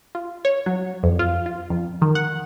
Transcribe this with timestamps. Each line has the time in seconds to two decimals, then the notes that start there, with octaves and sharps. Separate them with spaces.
0.15 F4
0.45 C#5
0.66 F#3
1.03 F2
1.19 F4
1.46 F4
1.70 F2
2.02 D#3
2.15 F#5